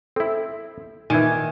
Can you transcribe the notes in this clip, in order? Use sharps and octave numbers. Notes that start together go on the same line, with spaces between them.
C4 E4 A4
A#2 D#3 E3 G#5 G#6